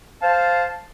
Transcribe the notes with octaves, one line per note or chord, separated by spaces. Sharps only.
C5 F5 A5